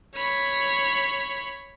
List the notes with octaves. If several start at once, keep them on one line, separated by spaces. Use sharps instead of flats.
C#5 B5